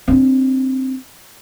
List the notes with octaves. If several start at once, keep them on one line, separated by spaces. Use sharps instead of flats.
C4 D4